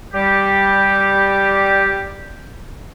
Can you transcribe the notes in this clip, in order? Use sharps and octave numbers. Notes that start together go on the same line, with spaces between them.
G3 G4